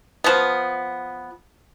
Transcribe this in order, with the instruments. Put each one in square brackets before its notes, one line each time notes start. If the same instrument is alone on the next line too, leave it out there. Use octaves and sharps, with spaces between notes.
[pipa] F3 B3